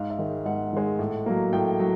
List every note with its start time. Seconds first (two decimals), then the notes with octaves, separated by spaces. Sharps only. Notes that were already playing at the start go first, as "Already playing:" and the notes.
Already playing: G#2 F5
0.10 E5
0.19 D#3 G#3
0.45 G#2 F#5
0.73 D#3 G#3
0.99 A2
1.26 F#3 A#3
1.53 A2 G5
1.80 F#3